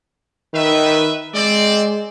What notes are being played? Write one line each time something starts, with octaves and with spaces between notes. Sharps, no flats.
D#3 B4 E5
G#3 C4 D5